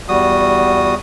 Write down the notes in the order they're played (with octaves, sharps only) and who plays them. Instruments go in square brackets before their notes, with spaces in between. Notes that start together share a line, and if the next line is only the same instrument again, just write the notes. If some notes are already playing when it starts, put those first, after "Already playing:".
[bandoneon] E2 G3 F#4 D#6